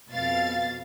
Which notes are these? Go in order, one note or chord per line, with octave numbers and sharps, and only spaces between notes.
F2 B2 F5 A6